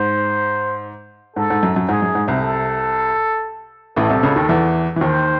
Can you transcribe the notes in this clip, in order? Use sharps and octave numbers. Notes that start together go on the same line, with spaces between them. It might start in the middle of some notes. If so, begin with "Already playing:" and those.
Already playing: G#2 C5
G#2 A4
G#2
F#2
F#2
G#2 G#4
F#2
G#2
C2 C3
A4
A1 A2 A4
C2 C3
C#2 C#3
D#2 D#3
E2 E3
E3
D#2 D#3 C5